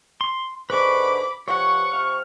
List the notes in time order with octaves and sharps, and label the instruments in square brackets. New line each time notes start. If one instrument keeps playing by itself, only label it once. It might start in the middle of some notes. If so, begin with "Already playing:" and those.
[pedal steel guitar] C6
[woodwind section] G#2 D3 [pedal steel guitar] B4 C#6 [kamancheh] B5 D6
[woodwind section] G2 C3 F3 [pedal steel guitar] C#5 [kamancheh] F#5 [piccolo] C#6
[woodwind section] C3 F3 F6